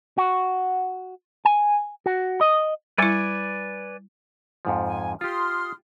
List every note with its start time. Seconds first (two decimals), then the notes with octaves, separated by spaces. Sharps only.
0.18 F#4
1.45 G#5
2.06 F#4
2.41 D#5
2.98 G3 E4 B4 D5 G#5
4.65 F2 G#2 F3
4.86 G#5
5.21 F4 G4 C6 D#6 F6